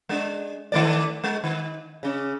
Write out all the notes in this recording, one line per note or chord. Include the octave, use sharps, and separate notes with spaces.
G#3 D4
D#3 A3 D5
G#3
D#3
C#3 C#4